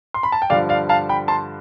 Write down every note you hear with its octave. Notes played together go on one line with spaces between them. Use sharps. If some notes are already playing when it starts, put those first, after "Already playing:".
C6
B5
A5
G5
G2 D3 F3 D5 F5
D5 F5
F5 A5
G5 B5
A5 C6